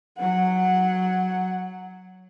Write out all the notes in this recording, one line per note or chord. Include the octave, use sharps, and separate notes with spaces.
F#3 F#5